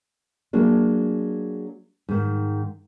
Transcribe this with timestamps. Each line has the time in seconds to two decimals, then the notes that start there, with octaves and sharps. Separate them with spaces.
0.53 F#3 G#3 A#3 D4
2.09 G#2 D#3